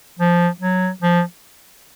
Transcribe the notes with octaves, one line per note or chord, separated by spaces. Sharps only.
F3
F#3
F3